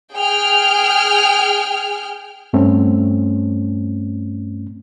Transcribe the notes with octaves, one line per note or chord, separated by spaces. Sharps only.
G#4 G5 F6
G2 A3 C4 C#4